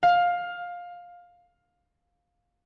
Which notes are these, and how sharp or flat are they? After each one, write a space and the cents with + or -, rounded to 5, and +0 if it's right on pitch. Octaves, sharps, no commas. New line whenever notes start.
F5 +15